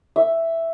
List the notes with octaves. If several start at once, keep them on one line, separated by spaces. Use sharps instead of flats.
E5